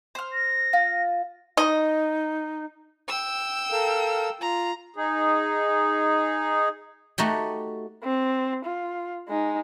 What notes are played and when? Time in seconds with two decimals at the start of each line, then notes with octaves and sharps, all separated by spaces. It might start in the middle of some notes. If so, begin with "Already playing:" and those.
0.15 C5 F6
0.33 A#6
0.73 F4
1.57 D#4 D#5
3.08 G5 E6
3.72 A4 A#4 F5
4.41 F4 A#5
4.96 D#4 G#4
7.18 A3 D#4 F#4 G4
8.04 C4
8.65 F4
9.28 G#3 D#4